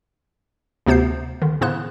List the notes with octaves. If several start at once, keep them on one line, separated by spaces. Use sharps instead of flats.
D2 C3 B3 C5 G6 C7
D3 D#3
A2 C#3 B3 C5 C6 F#6